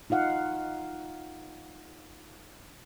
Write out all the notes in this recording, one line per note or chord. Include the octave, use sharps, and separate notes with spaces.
D#4 F4 F5 F#5